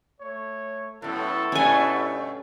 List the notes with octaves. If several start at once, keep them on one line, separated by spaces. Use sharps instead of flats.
A3 C#5
F#2 A2 B3 E4 A4
G2 B2 A3 C#4 G#5